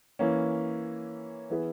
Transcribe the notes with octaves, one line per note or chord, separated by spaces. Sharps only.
E3 A#3 C#4
E3 B3 E4 G#4